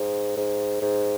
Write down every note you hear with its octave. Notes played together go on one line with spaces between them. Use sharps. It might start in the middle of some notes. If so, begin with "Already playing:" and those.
Already playing: G#2
G#2
G#2